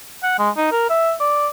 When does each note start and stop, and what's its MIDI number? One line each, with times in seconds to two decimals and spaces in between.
0.23 0.38 78
0.39 0.50 56
0.57 0.71 63
0.72 0.89 70
0.90 1.13 76
1.20 1.48 74